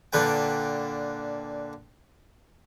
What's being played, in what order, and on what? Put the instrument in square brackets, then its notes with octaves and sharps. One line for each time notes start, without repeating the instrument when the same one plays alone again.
[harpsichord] A#2 D3 B4 G5